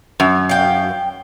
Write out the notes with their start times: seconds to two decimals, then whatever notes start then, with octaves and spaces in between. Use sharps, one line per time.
0.20 F#2
0.49 F5 G5